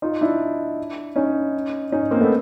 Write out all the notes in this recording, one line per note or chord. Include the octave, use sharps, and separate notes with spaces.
D#4 F4
D4 E4
C#4 D#4
C#4 D#4
A#3 C4
A3 B3